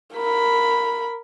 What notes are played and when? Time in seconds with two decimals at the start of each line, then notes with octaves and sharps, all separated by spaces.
0.14 A#4 B5